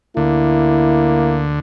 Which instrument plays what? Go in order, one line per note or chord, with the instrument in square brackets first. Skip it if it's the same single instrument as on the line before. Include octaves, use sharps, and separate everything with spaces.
[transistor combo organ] D2 D3 [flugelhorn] A#3 [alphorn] E4